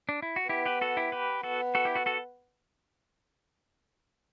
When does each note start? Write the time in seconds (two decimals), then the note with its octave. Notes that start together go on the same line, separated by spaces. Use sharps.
0.09 D4
0.22 E4
0.36 F#4
0.49 B3 E4 G4
0.66 G4 B4
0.81 F#4 A4
0.97 E4 G4
1.12 G4 B4
1.43 B3 F#4 A4
1.75 F#4 A4
1.85 E4 G4
1.95 F#4 A4
2.06 F#4 A4